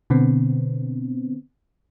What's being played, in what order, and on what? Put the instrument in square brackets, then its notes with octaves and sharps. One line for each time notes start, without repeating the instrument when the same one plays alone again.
[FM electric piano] B2 D3 B3 C4